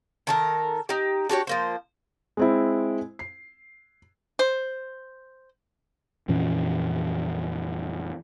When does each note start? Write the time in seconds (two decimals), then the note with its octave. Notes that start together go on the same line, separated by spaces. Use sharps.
0.27 D#3 A4 A#4
0.89 D#4 G4
1.29 D4 F#4 G4 C#5
1.47 F3 A#3 C5
2.37 G#3 C4 E4
3.19 C7
4.39 C5
6.28 F2 A#2 E3 C#4